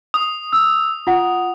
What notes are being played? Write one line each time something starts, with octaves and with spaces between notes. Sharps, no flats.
D#6
E6
F4 F#5